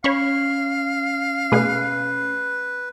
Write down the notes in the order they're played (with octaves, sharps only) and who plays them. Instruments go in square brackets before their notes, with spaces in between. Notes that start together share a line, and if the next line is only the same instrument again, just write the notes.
[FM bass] C#4 [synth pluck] C#5 B5 C#6 [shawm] F5
[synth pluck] B2 A3 G#4 [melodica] B4